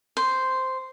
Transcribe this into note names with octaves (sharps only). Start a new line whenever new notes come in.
C5